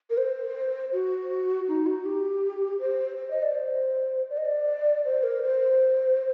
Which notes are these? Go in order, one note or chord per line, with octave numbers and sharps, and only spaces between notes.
A#4
C5
F#4
D#4
F#4
G4
C5
C5
D#5
D5
C5
D5
D#5
D5
C5
A#4
C5